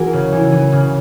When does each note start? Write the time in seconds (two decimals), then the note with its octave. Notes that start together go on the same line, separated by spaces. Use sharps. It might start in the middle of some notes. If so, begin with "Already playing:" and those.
Already playing: E3 F#4 G#4 A#4
0.13 C#3
0.32 E3
0.52 E3
0.72 C#3